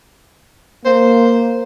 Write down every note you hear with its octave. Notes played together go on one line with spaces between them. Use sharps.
A#3 C5